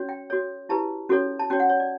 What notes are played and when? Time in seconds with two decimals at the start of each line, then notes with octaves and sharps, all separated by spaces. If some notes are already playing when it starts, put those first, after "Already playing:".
Already playing: C#4 F#4 C#5
0.09 G5
0.30 F#4 A4 C#5
0.69 E4 G4 B4 A5
1.09 C#4 F#4 A4 C#5
1.39 A5
1.50 C#4 F#4 C#5 G5
1.60 F#5
1.69 C#5
1.80 D5